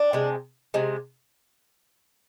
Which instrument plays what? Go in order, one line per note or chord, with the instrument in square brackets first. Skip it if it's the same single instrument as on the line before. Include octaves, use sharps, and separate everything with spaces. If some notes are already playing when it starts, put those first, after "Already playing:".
Already playing: [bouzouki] D4
C3 G#3
C3 G#3